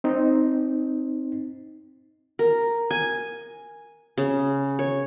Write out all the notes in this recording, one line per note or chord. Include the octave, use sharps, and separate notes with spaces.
C4 D#4
A#4
G#5
C#3
C#5